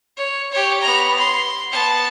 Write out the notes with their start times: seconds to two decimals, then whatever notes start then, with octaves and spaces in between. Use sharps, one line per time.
0.17 C#5
0.52 G4 C#5
0.81 B3 A#5
1.18 C6
1.71 B3 A5